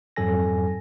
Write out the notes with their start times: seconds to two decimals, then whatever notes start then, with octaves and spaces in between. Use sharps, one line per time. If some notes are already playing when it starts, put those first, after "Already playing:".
0.16 F2 G#2 F#3 A4 G#5 A#6